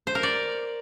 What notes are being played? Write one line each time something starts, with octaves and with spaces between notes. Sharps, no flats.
C5
A#4
D5